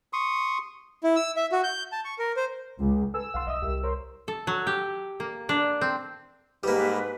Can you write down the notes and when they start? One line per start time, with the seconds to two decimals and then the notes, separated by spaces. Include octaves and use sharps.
0.13 C6 C#6 D#6
1.04 E4
1.16 E6
1.37 E5
1.52 F#4
1.64 G6
1.92 A5
2.05 C#6
2.19 A#4
2.37 C5
2.80 C#2
3.14 A4 B4 G#5 E6
3.34 B1 F5 F#5 C6
3.47 B1 D#5 E5 D#6
3.62 C2 G4 A#4
3.84 A#4 C5 C#5
4.28 A4
4.47 F#3
4.67 G4
5.20 A#3
5.49 D4
5.81 C4
6.63 G#2 G3 A#3 G4 B4